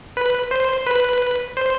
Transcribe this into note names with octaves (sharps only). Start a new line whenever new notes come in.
B4
C5
B4
C5